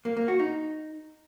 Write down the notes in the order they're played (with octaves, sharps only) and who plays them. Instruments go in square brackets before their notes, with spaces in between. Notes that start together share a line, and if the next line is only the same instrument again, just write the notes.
[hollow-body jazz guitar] A#3
A#3
F#4
D#4